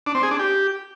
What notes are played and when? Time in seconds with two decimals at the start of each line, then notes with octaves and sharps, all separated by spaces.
0.06 D4
0.15 C4
0.23 G#4
0.31 D4
0.39 G4